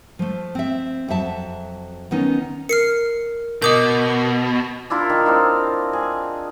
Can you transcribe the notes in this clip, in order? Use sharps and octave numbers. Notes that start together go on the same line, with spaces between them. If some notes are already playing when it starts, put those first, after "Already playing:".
F3 A3
C4 E5
F2 F#3 E5 A5
D#3 B3 C#4 D#4
A#4 F6 C7 C#7
B2 A#4 D#5 D6 D#6 G6
D4 E4 F4 A#4
D#3
C4 D4 E4 F4
G#4